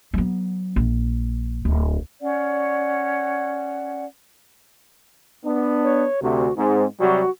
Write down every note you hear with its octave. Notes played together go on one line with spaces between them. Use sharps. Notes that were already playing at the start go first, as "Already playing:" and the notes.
F#3 B3
A#1
D1
C#4 D5 F#5
B3 D4
C#5
D2 C3 F#4
G#2 C4
C3 F#3 G3 F#4